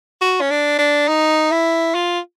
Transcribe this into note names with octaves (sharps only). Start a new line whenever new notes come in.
F#4
C#4
D4
D4
D#4
E4
F4